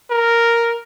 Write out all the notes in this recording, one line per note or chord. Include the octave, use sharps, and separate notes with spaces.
A#4